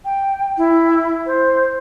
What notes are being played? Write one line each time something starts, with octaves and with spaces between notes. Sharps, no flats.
G5
E4
C5